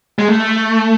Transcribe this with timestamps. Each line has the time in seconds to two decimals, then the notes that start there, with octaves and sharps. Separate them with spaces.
0.19 G#3
0.28 A3